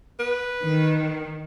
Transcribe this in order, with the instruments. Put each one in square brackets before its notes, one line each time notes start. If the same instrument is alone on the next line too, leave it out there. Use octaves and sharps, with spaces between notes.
[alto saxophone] B4
[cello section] D#3